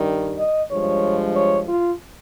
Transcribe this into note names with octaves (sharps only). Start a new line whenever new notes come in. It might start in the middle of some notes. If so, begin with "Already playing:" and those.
Already playing: G2 D#3 G3
D#5
G2 F3 G#3 C#5
C#5
F4